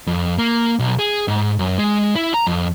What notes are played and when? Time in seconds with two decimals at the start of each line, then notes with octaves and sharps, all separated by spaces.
0.07 F2
0.38 A#3
0.79 B1
0.99 G#4
1.28 G#2
1.59 F#2
1.78 G#3
2.15 E4
2.34 A#5
2.47 F2